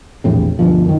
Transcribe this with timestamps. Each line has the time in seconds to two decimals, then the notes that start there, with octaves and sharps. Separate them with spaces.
0.24 A#1 E2 A2 C3
0.59 D2 G2 B2 F3
0.85 F#2 D#3